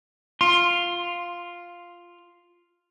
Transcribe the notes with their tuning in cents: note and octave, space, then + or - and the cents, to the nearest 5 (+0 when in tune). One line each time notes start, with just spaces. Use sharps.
F4 +0 C6 +20